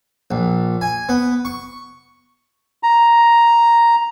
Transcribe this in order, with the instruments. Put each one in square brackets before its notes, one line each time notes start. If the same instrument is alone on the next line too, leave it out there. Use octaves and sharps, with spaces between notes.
[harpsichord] A#1
G#5
B3
C#6
[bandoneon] A#5